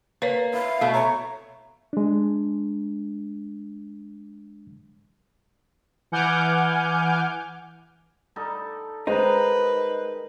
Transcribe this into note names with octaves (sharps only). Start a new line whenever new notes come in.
A#3 B4 C#5
E4 F5
B2 A3 E5
C#5 A#5
G#3 D4
E3 F#5 G#5 D6 F6 G6
G3 D#4 A4
D#3 G#3 D#4 B4 C5 G5 A#5